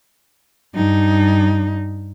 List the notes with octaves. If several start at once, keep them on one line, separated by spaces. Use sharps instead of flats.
G2 D#4